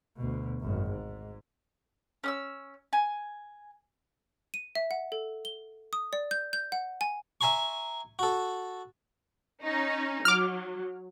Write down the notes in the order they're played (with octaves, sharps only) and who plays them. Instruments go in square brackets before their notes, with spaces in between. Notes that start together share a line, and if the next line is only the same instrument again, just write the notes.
[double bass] D2 B2
G#1 F#2
G#2
[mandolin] C#4 D#6 E6
G#5
[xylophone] D#7
E5
F#5
A4
G7
D#6
D5
G6
G6
F#5
G#5
[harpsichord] E5 G#5 A#5 C6 C#6
F#4 A4
[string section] C#4 D#4
[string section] F#3 [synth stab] D6 F6